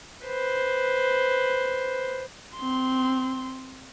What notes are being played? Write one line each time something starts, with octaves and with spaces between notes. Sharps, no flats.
B4 C5
C4 C6